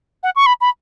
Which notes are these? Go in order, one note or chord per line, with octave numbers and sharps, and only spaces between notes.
F#5
C#6
B5
B5